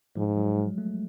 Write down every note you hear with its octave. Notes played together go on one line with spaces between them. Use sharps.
G#2 F3
F#3
G#3
A3